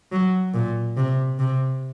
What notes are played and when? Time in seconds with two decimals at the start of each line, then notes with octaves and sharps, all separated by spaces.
0.12 F#3
0.54 A#2
0.97 C3
1.39 C3